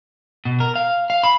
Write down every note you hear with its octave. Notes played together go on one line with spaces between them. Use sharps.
B2
A#4
F5
F5
B5